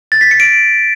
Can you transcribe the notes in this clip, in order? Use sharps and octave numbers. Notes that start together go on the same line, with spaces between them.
A6
B6
C#7
D7